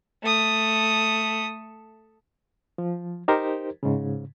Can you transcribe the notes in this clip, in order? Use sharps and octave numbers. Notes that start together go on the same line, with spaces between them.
A3 D#6
F3
D#4 G4 A#4 C5
G#2 C#3